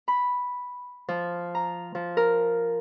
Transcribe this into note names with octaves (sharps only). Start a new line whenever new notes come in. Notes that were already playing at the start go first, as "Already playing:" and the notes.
B5
F3
A#5
F3
A#4